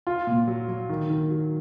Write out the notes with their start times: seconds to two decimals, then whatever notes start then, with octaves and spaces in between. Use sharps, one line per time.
0.07 F4
0.27 A#2
0.48 F#3
0.68 F#3
0.89 D#3
1.10 D#3
1.31 F#3